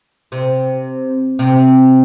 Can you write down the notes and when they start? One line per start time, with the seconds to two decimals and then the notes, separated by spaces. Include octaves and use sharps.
0.32 C3
1.39 C3